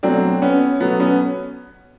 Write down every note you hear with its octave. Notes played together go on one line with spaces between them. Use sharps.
B2 F#3 A3 C4 D4
B3 C#4
B2 F#3 A3 B3
B3 C#4